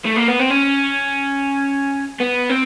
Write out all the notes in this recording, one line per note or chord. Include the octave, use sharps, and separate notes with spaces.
A3
A#3
B3
C4
C#4
B3
C4